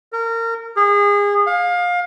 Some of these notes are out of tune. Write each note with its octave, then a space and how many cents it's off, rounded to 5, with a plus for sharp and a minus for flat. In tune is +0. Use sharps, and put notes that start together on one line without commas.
A#4 -25
G#4 -30
F5 +25